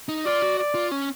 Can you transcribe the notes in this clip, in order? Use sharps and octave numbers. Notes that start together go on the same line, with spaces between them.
D#4
F4 D5
F#4
D5
F4
C#4